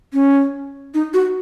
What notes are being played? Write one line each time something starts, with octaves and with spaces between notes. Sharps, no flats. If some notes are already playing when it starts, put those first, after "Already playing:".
C#4
D#4
F#4